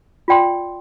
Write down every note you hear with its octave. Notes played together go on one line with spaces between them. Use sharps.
F4 D5 G5 C6